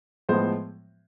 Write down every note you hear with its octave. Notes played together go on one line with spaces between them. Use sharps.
A2 F3 G#3 B3 C5